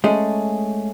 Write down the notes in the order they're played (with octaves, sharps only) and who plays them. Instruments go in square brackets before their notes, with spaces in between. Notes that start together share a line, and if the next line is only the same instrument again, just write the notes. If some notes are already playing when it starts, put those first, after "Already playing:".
[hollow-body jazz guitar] G#3 A3 C#4 G#4